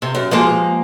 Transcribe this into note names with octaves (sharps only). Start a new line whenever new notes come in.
C3
F#2
F3 G#3 A#3